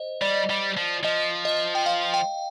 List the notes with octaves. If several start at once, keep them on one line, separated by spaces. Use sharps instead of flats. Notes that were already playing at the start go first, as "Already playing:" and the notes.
Already playing: C5 D#5
G3 D5
G3
F3
F3 D#5
D#5
G5
F5
G5